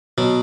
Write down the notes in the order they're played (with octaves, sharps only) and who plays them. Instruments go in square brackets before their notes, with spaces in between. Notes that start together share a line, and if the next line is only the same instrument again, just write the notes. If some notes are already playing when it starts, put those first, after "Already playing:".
[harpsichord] B2 F#3